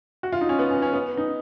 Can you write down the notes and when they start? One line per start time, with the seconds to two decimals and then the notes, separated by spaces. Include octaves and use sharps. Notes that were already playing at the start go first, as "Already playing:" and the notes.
0.23 F#4
0.32 F4
0.41 D#4
0.49 C#4
0.59 B3
0.70 C#4
0.82 C#4
0.93 B3
1.17 D#4